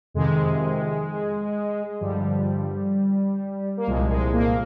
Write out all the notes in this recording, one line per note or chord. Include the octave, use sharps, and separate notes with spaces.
F2 C3 D#3 G#3
G2 D3 F3 G3
A#3
C2 A#2 F3 G#3
G#3
A#3